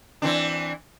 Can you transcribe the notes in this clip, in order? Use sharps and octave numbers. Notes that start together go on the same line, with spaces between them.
E3 C4 D4